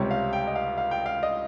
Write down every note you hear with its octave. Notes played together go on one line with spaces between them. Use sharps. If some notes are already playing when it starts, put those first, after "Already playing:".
Already playing: C#2 C3 G3 C#5
F5
G5
D#5
F5
F5
G5
F5
D#5